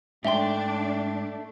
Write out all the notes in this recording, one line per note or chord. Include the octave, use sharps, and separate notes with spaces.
G#2 A3 D4 E5 G5 C6